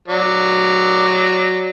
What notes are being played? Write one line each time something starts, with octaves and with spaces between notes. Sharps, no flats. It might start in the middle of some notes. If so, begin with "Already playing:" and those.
F#3 D5